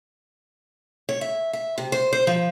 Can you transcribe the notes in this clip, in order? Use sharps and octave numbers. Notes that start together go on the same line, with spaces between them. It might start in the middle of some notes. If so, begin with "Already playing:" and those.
C#5
E5
E5
C3
C5
C5
F3